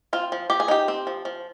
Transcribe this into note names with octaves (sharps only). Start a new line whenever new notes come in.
C4 F4
F3
F3 G4
G#4
D#4 G4
C4
F3
F3